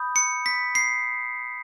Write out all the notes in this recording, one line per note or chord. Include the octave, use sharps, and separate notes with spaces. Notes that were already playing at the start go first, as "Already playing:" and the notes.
Already playing: B5 D#6 G6
C#7
B6
C7